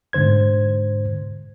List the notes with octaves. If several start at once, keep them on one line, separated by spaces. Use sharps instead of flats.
G#2 B2 D3 C5 G#6